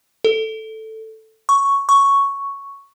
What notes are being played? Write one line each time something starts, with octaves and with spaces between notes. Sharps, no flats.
A4
C#6
C#6